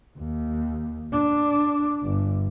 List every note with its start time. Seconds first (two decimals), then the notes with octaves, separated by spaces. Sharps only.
0.18 D#2
1.12 D4
2.04 G1